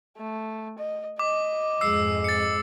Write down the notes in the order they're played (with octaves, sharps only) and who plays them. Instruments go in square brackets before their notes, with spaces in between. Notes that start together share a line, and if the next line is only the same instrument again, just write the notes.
[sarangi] A3
D#5
[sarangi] D#5 [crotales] D6
[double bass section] F2 G#2 G#3 [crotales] E6 C7
[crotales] A6 C#7